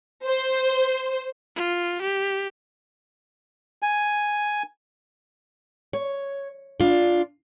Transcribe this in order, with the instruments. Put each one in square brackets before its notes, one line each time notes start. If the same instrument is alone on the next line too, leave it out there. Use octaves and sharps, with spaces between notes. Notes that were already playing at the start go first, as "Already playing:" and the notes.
[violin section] C5
[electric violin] F4
G4
[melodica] G#5
[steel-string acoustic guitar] C#5
D4 F4